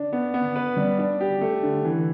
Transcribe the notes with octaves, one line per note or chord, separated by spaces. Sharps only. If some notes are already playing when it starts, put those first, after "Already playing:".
Already playing: D4
B3
B3
B4
G3
D4
G4
A3
D3
E3